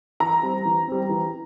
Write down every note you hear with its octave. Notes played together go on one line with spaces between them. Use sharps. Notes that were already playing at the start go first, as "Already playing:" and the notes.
E3 A#5
G3 C4
E3
G3 C4
E3